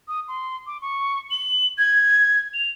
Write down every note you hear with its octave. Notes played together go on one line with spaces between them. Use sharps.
D#6
C6
D6
C#6
F#7
G#6
F7